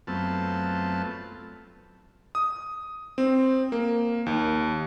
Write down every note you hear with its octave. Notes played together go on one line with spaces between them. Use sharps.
F#2 A3 B3 C4 F4 A5
D#6
C4
A#3
D#2